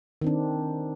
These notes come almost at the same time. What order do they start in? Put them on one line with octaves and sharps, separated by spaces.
D#3 C4 D4